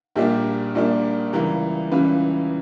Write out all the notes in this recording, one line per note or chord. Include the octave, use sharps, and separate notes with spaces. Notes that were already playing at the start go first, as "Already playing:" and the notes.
A#1 A#2 G3 A#3 D4 G4
A#1 A#2 G3 A#3 D4
C#2 C#3 E3 G3 A#4
C#2 C#3 E3 G3 B4